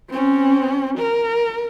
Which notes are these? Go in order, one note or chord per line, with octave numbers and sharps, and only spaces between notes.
C4 C#4
A#4